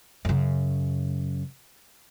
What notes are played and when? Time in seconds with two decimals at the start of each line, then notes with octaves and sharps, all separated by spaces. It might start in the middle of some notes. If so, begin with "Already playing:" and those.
0.25 F#2 C#3